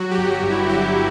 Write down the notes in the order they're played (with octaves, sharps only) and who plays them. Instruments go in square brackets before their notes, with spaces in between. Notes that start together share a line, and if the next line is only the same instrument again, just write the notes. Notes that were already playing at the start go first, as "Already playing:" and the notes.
Already playing: [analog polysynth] F#3 F#4
G4
G1
G4
G2
E4
G1 G4